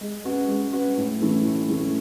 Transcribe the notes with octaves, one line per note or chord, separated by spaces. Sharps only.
G#3
C#4 F#4 B4
G#3
C#4 F#4 B4
A2
E3 A3 C#4
A2
E3 A3 C#4